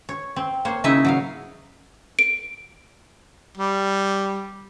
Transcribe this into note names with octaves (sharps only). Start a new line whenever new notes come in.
C#5
C4
A#3 C5 C#5
C#3 D#4 E4 C#5 D#5 E5
F#3 A#4 F5
D7
G3